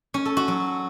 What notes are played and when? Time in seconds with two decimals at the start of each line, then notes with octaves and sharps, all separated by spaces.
0.14 C#4
0.25 A4
0.37 F#4
0.48 F#3